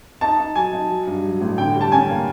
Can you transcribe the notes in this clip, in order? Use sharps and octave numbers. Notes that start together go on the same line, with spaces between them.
D#4 A5
D#4
F#3 G#5
D#4
F#3
G2
F#3
A1
D3 G5
G3
A5
C#4 G#5
A#3